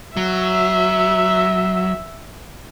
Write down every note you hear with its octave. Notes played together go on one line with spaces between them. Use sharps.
F#3 E5